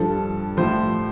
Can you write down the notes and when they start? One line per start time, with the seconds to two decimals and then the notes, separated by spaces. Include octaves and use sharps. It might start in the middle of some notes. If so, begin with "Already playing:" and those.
Already playing: G2 F3 A4
0.57 A2 F3 C5